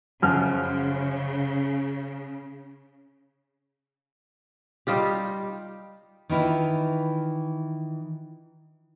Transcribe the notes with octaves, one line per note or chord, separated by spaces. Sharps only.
F#2 C#3 F3 F6
G3 D#4 F4 G4
D#3 E3 E4 F4